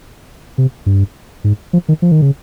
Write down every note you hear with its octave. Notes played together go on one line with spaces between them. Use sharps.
C3
G2
G#2
F3
D#3
F3
D#3
C#3